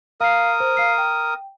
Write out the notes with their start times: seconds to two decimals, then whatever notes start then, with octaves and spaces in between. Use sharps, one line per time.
0.21 A#4 F5 D#6 C7
0.60 C5
0.77 F5 C7
0.98 G5